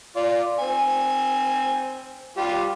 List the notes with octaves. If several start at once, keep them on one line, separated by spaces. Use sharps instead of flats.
F4 D5
C4 G#5
G3 F4 G4